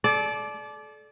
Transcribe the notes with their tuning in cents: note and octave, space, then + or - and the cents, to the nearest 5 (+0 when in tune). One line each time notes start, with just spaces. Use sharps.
A4 -35 D5 +0